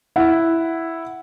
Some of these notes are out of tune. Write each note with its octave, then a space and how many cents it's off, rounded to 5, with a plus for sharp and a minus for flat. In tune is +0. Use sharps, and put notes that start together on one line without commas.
E4 +0 F#5 +0